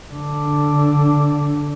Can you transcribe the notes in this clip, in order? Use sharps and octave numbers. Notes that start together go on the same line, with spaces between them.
D3 D4